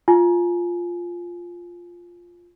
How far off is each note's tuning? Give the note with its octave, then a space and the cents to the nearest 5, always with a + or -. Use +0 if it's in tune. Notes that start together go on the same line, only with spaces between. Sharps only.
F4 +0 G#5 +25